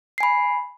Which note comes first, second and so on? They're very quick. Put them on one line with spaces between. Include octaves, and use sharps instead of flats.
C7 G#5 B5